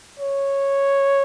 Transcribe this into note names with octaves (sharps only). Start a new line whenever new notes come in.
C#5